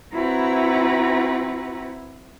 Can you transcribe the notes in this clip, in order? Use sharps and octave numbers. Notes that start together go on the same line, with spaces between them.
C4 E4 F#4 B4 A#5